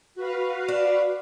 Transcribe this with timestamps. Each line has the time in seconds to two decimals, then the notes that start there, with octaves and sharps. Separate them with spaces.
0.15 F#4 B4 F5
0.68 D4